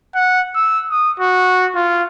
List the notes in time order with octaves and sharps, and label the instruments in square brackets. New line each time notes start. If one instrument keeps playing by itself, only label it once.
[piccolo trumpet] F#5
E6
D#6
F#4
F4